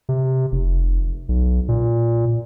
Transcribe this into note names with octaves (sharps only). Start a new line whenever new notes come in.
C3
F1
B1
A#2